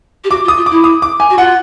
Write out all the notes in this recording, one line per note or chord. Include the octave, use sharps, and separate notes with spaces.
G4
F#4 D6
F4
D#6
F4
E4 D6
D#6
D6
G#5
F#4
F4 F#5